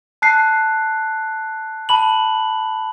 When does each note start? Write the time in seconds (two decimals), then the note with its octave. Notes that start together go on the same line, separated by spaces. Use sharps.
0.22 A5 F#6 C7
1.89 A5 B5 F#7